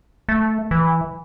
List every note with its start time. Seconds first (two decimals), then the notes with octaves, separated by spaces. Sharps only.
0.29 A3
0.71 E3